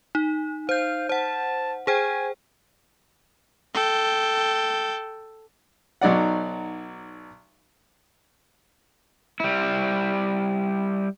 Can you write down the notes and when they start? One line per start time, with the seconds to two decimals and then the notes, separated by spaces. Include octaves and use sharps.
0.15 D#4
0.69 C5 F5 G6
1.09 C5 F#5 A5
1.87 G#4 C5 G5 G#5
3.74 A4 G5
6.01 B1 F#3 D#4 D5 F#5
9.40 G3 E4